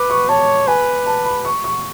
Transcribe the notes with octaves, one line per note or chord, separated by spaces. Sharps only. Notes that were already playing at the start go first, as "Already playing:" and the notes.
Already playing: B4 D6
C#6
C#5 A5
B4 G#5
A5
B5
C#6
C#6